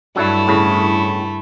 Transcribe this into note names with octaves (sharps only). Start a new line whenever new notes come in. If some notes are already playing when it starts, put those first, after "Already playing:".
G2 F#3 A3 D4 E4 A4
A2 C#3